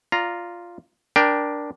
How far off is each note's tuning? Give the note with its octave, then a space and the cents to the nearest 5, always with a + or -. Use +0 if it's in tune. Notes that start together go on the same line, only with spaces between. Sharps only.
F4 -5 D5 +0 A#5 +0
D4 +0 A#4 +20 G5 +0